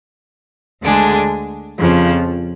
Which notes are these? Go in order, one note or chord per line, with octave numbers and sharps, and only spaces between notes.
D2 D3 G#3 D4 G#4
F2 C#3 F3